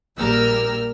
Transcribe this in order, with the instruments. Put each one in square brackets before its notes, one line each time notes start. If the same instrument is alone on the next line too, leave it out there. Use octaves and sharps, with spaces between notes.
[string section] A#1 G3 A#3 A#4 E6 F6